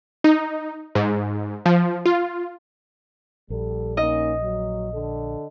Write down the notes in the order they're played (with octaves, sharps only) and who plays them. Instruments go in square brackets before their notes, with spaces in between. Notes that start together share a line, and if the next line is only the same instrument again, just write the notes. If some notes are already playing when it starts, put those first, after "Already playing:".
[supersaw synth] D#4
G#2
F3
F4
[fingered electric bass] A#1 [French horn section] G3 A4
[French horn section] A#3 C#4 D#4 [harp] D#5
[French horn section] F#3
D3 A4